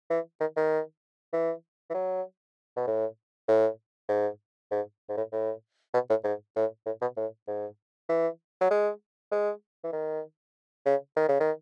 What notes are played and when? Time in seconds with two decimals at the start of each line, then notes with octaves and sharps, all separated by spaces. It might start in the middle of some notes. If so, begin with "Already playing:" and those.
0.10 E3
0.40 D#3
0.57 D#3
1.33 E3
1.90 E3
1.94 F#3
2.77 B2
2.87 A2
3.48 A2
4.09 G#2
4.72 G#2
5.09 G#2
5.17 A2
5.32 A2
5.94 B2
6.10 A2
6.24 G#2
6.56 A2
6.86 A2
7.02 B2
7.17 A2
7.48 G#2
8.09 E3
8.61 F#3
8.71 G#3
9.32 G#3
9.84 E3
9.93 D#3
10.86 C#3
11.16 D#3
11.29 C#3
11.40 D#3